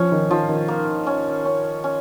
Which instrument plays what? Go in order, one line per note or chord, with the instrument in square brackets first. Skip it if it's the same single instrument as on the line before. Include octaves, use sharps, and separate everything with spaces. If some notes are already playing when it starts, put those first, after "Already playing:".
Already playing: [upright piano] F3 [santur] C#4
[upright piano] D#3
[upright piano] D#3 [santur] F3
[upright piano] D#3
[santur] A#3
C#4
C#4
C#4